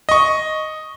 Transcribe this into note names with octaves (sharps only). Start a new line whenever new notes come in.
D#5 C#6